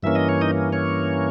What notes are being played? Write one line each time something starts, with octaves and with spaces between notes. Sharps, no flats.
G2 E3 A#3 C#4 E5
D#5
C#5
D#4 D#5
C#4 C#5